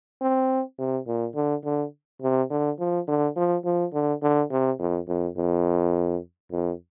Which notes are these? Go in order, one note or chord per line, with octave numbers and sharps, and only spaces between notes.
C4
C3
A#2
D3
D3
C3
D3
F3
D3
F3
F3
D3
D3
C3
F2
F2
F2
F2